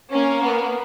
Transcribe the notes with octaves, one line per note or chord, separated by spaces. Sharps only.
A#3 C#4
B3